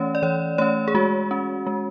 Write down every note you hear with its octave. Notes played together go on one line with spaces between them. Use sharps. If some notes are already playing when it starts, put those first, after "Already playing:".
Already playing: E3 A3 C#4 C#5
D5
E3 C#5
A3 C#4 C#5
G#4
G#3 F#4
C#4
G#3